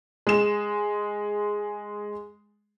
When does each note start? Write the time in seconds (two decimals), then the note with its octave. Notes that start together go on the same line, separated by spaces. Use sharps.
0.27 G#3 E7